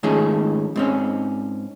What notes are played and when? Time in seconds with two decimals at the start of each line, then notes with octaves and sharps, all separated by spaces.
0.03 G#2 D#3 F3 A3 C#4 G#4
0.76 G#2 C4 C#4